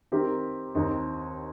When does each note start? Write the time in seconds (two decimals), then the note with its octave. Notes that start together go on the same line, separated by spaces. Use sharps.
0.12 D#3 C4 G4 A#4
0.75 D#2 D#3 C4 D#4